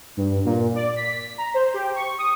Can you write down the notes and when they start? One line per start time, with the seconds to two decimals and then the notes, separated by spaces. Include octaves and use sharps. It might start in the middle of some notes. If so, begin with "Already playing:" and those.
0.17 G2
0.45 A#2
0.75 D5
0.96 B6
1.38 A#5
1.54 C5
1.74 G4
1.96 C#6
2.18 D#6